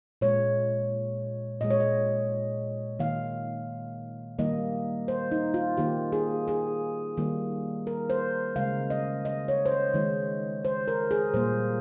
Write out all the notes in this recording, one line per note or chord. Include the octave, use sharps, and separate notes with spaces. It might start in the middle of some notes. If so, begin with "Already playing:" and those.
A#2 G#3 C#5
A#2 G#3 D#5
C#5
D#5
D#3 A#3 F5
D#3 G3 A#3 D#5
C5
D#4
F4
D#3 A#3 G4
G#4
G#4
D#3 G3 A#3
A#4
C5
C#3 G#3 F5
D#5
D#5
C#5
C5
C#5
D#3 G#3
C5
A#4
G#4
A#2 G3 A#3 C5